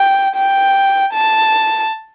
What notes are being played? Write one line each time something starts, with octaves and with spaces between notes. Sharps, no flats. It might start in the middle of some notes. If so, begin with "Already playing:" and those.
Already playing: G5
G5
A5